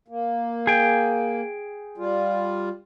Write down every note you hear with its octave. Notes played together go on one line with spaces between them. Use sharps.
A#3
G#4 G5
G3 F4